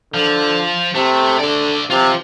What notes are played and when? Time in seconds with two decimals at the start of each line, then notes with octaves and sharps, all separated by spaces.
0.14 D3 F3
0.94 C3 A3
1.39 D3 D5 E5
1.90 C3 F4 C5